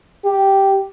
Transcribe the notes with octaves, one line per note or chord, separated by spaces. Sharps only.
G4